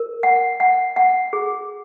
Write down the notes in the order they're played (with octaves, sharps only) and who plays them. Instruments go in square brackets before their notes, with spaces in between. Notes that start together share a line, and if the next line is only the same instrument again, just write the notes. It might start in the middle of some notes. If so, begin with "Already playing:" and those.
Already playing: [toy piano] A#4
F#5
F#5
F#5
G#4